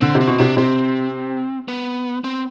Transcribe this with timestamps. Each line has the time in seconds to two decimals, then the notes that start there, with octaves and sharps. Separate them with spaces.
0.01 D3 C4
0.15 C3
0.21 C4
0.27 B2
0.38 C3 D4
0.57 C3 C4
1.68 B3
2.24 C4